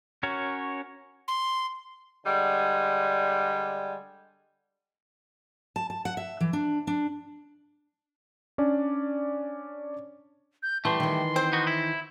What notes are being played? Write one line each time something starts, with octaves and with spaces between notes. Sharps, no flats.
C#4 F#4 A#4 C#5
C6
D3 G3 G#3
A5
A5
F#5
E5
E3
D4
D4
C#4 D4 D5
G6
E3 G3 A3 A4 C6
D#3 E3
C4 C5
B3 D#4 F#4
E4